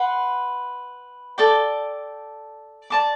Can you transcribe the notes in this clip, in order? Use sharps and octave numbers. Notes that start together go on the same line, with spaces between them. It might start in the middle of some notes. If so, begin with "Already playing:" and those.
Already playing: B4 F#5 C6
A4 D5 G5 D6
D5 A5 D6